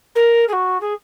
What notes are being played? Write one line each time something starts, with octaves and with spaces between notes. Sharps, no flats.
A#4
G#4
F#4
G#4